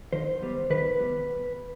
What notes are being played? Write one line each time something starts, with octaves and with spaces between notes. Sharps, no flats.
D#3 C5
G3 B3
D#3 B4
G3 B3